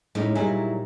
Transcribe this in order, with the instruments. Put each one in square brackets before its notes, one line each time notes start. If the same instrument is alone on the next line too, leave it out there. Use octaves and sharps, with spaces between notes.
[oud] A2 [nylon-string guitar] G#3 C#4 D#4
[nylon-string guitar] A#2 G3 D#4 [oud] F#3 E4 G#4